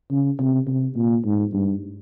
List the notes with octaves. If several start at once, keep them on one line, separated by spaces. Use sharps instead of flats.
C#3
C3
C3
A#2
G#2
G2